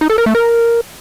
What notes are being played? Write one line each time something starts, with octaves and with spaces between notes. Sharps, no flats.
D#4
A4
A#4
A3
A#4